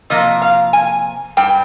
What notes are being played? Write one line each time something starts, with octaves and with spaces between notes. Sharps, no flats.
C3 F3 A#3 D#5
F5
G#5
G2 G3 G5